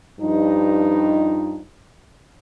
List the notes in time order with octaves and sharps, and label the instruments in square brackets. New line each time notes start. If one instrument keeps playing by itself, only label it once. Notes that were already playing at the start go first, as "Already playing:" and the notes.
[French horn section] G2 F3 D#4